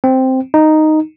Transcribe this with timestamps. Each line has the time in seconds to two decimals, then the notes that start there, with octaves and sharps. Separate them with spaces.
0.04 C4
0.54 D#4